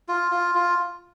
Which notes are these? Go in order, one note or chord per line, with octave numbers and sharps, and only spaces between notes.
F4
F4
F4